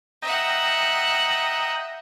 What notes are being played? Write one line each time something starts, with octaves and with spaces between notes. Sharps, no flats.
D#5 E5 F#5 G5 A#5